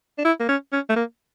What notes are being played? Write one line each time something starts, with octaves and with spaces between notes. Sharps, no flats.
D4
E4
A#3
C#4
C#4
A3
A#3